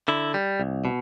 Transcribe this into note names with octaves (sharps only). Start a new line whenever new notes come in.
D3 E4
G3
C2
B2